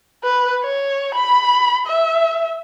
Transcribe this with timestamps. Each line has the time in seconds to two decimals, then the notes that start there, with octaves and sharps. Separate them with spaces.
0.24 B4
0.64 C#5
1.15 B5
1.87 E5